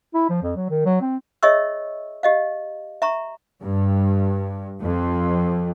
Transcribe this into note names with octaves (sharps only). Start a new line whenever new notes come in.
E4
F3
F2
F#3
D#3
F#3
C4
G#4 C#5 D#5 E5 C#6 E6
G4 D#5 F5
E5 A#5 C#6
G2
F2